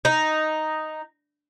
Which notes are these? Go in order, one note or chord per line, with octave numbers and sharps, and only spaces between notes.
D#4